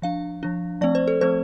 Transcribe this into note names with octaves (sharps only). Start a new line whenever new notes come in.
F3 D4 F5
F3 D4
F3 A3 C4 D5
C5
A4
F3 A3 C4 C5